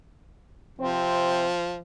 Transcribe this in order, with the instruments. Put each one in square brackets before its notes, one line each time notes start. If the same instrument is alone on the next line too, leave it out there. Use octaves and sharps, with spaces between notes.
[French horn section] C3 C4 [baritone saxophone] F3